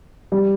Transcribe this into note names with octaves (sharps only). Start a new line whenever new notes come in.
G3